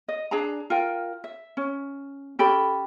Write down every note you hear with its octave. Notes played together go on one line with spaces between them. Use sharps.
D#5
D4 G#4 A5 A#5
F4 A#4 G5
E5
C#4
C#4 G4 A4 B5